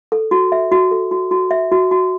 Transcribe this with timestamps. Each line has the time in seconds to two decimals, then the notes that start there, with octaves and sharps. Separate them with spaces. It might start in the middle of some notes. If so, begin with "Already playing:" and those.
0.12 A4
0.31 F#4
0.52 E5
0.72 F#4
0.91 A4
1.11 F#4
1.31 F#4
1.51 E5
1.72 F#4
1.91 F#4